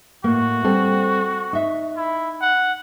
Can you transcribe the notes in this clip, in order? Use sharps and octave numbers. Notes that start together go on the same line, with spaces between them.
A2 A#3 F#4
G3 C4 A4
D#4 E5
E4
F#5